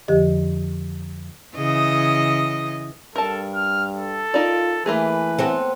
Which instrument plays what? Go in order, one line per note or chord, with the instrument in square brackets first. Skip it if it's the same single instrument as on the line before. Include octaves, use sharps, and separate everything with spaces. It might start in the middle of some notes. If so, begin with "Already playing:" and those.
[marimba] F2 D3 F3 G4 D#5
[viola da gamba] C#3 E3 D#5
[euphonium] G2 [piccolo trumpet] A4 [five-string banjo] A#4 A5
[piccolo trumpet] F6
A4
[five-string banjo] D#4 A#4 D5 [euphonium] F4
[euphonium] E3 [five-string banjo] A3 A#3 G#4 [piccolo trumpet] B4
[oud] B3 C4 A4